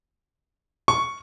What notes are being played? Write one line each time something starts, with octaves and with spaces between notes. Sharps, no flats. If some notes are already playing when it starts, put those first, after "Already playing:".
C#6